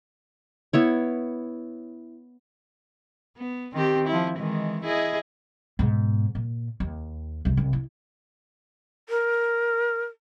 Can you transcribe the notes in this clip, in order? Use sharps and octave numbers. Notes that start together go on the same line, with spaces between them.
B3 E4 C#5
B3
D#3 C4 G4
F3 E4
D#3 E3 G#3
E4 G#4 D#5
G#2 B2
A#2
D#2
C2 C3
C2
E4
A#4